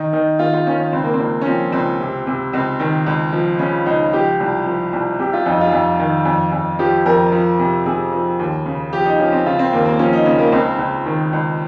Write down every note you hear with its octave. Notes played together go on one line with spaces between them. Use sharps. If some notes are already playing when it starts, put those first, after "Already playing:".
Already playing: D#3 D#4
D#3 D#4
D#3 F4
F4
D#3 C#4
C#4
C#2 C4
A#3
C4
C#2
C#4
F3 C4
C#2 C4
C3
C3
C#2 C4
D#3
C#2
F3
C#3 C#4
C#2 D#4
F3 G4
C2
F3
C2
C3 G4
F4
F2 D#4
F4
F2
D#3
F2
F2
F3 G4
F2 A#4
F3
C3
C3 G#4
F3
D#2
C#3
F3 G4
D#4
F3 C#4
C4
C#3 F4
C4
D#2 A#3
A#3
F3 C#4
D#4
C#3 C#4
A#3
C#2 C4
C#2
D#3
C#2